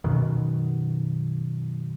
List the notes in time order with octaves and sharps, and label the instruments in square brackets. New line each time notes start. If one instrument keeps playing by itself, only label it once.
[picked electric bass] F#2 B2 D#3